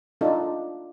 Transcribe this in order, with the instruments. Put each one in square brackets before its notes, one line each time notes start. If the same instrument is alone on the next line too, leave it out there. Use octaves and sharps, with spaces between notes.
[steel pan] D4 D#4 F4 A4